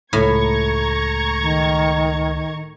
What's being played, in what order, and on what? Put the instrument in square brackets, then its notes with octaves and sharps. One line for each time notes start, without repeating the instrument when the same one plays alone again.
[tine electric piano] C#2 A3 [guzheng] A2 [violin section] A#5 C#6 G#6
[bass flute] D#3